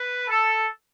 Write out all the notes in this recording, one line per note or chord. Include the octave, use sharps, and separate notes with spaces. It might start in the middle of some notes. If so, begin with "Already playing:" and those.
Already playing: B4
A4